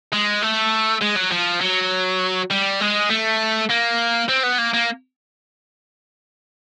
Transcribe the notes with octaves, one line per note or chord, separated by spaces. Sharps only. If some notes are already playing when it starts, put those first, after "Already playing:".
G#3
A3
G#3
F#3
F3
F#3
G3
G#3
A3
A#3
C4
B3
A#3
A#3